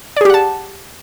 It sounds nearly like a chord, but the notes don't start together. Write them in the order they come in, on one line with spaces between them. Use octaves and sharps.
D5 G#4 G4 F#5 A5